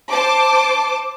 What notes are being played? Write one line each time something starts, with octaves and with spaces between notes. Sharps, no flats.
C5 A5 D6